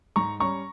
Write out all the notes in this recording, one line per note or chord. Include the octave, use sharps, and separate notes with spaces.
G#2 A#5 C#6
G3 C#4 A#5 C#6